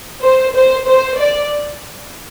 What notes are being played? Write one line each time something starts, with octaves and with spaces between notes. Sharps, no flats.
C5
C5
C5
D5